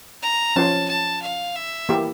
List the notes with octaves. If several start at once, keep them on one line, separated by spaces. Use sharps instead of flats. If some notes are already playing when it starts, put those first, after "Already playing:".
A#5
F3 C#4 F4 C#5 A5
A5
F5
E5
E3 A#3 E4 G4